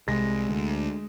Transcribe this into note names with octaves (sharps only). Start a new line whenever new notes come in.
C2 G#3 A#6
D2